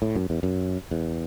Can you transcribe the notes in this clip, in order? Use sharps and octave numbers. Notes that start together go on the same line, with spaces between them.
A2
F#2
E2
F#2
E2